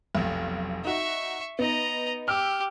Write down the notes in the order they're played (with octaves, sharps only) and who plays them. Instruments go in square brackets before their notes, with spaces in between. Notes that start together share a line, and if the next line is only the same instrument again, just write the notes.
[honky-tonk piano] F1 B1
[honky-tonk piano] D#4 F#4 [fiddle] E5 C#6
[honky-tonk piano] B3 D#4 [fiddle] D#5 A#5
[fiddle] G4 [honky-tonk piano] D6 E6 F6